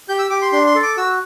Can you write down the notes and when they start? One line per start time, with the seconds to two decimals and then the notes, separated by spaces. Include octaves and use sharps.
0.09 G4 G6
0.19 E6
0.30 G4 D6
0.42 C6
0.52 D4 C6
0.67 C6
0.75 A4
0.83 D6
0.97 F#4 E6